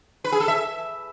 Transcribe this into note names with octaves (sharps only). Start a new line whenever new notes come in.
B4
G#4
A4
E5